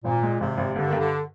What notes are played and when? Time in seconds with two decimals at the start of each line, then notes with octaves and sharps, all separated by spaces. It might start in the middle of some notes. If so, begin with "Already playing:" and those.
0.04 G#1 A#2
0.23 G#3
0.40 G#1 C3
0.57 G#1
0.75 G2 D3
0.87 G2 D#3
0.99 D3